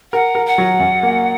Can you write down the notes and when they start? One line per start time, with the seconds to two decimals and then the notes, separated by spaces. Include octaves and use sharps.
0.13 A#4 F#5
0.35 A#4
0.46 F#5
0.58 F#3
0.80 F#2
1.03 A#3